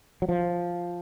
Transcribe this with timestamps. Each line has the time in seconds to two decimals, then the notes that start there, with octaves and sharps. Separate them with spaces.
0.22 F#3
0.29 F3